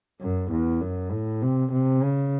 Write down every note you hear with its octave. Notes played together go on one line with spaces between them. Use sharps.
F#2
E2
F#2
A2
C3
C3
C#3